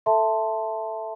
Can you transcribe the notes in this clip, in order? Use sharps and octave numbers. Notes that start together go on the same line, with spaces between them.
A4 E5 A5 C6